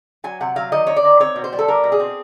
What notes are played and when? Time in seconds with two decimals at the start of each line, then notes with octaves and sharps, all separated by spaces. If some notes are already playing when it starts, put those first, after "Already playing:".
0.24 F#3 G#5
0.40 C3 F#5
0.56 F#3 F5
0.72 D#3 D#5
0.87 D#3 C#5
0.96 D5
1.04 D#3
1.20 C4 C#5
1.36 B2
1.44 C5
1.53 G3
1.59 A4
1.68 G3 A#4
1.84 B2
1.92 G#4
2.00 C4